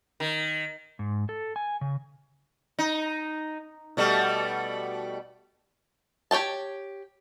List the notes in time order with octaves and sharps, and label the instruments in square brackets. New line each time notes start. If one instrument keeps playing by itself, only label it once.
[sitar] D#3
[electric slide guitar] G#2
A4
G#5
C#3
[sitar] D#4
B2 G3 A3
[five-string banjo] G4 C#5 G5 A5